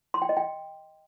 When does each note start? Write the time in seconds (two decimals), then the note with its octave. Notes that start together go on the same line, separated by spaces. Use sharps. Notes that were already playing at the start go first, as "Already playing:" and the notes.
0.14 C6
0.22 G5
0.29 D#5
0.37 G5